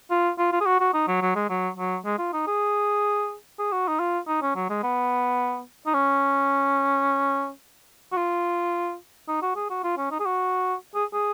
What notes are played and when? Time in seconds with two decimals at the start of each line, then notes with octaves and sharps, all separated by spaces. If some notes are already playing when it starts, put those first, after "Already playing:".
0.11 F4
0.38 F4
0.52 F4
0.61 G#4
0.66 F#4
0.80 F#4
0.94 D#4
1.08 F#3
1.22 F#3
1.35 G#3
1.50 F#3
1.77 F#3
2.05 G#3
2.19 F4
2.33 D#4
2.47 G#4
3.59 G#4
3.72 F#4
3.88 D#4
4.00 F4
4.28 D#4
4.42 C#4
4.55 F#3
4.69 G#3
4.83 B3
5.87 D#4
5.94 C#4
8.12 F#4
8.17 F4
9.28 D#4
9.42 F#4
9.56 G#4
9.70 F#4
9.84 F4
9.98 C#4
10.11 D#4
10.20 G#4
10.26 F#4
10.95 G#4
11.13 G#4